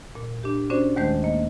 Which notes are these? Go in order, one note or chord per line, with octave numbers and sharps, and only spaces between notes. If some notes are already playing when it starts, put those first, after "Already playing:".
A#2
D4 G4
C#4 D4 F#4 C5 D5
D#2 D#3 G#3 A3 C5 G6
A#3 D#5